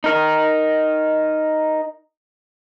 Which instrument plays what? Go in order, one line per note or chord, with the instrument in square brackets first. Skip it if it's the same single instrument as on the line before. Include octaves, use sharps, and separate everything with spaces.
[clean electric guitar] D#4 A#4